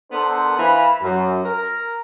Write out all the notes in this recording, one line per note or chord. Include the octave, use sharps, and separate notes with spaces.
B3 D4 A4 A#4 C5
E3 B4 F5 B5
F#2
A#4